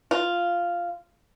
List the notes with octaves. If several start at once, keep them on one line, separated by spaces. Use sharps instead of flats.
F4